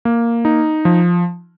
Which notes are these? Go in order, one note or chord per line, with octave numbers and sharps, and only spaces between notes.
A#3
D#4
F3